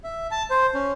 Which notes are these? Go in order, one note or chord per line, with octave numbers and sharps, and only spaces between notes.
E5
A5
C5
C#4